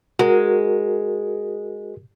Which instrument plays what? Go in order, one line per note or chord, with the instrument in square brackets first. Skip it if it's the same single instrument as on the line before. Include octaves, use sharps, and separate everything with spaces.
[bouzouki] G#3 [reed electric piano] F#4 A#4